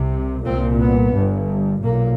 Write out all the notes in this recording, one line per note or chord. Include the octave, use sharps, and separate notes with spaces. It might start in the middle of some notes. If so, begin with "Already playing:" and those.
Already playing: C2 C3
C2 A#2 C4
B3
G1 G2
B1 A#2 A#3